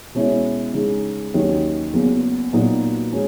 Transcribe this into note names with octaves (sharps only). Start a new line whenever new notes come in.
B2 G#3 C#4 E4
C#3 G#3 D#4
D#2 D#3 F#3 C#4
E2 C#3 F#3 A#3
A#2 F#3 B3 D#4 F#4
G#3 C#4 F#4